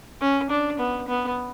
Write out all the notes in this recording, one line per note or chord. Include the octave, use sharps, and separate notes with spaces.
C#4
D4
B3
B3